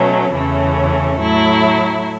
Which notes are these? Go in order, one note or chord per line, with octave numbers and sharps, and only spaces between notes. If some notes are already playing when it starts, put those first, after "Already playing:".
Already playing: B2 F#3 A3 C#4
E2 C#3 E3 A3 C#4
A2 F#3 A3 E4